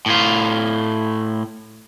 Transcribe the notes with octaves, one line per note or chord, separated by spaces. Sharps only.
A2 F4